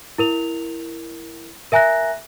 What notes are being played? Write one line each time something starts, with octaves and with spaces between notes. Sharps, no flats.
E4 A#4 F7
A#4 E5 G#5 A#5 F#6 A#6